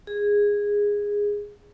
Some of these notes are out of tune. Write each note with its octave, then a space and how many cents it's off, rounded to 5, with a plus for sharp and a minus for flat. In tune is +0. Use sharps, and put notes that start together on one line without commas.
G#4 -15